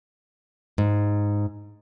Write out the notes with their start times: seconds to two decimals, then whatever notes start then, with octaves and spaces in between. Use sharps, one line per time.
0.78 G#2